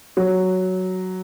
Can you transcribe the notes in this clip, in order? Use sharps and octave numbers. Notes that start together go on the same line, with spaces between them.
F#3